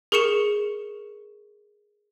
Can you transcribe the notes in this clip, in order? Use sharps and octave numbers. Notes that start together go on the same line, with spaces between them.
G#4 A#4 C#6 C#7 E7